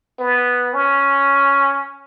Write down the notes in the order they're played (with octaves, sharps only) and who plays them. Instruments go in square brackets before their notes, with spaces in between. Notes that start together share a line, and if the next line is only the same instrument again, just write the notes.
[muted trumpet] B3
C#4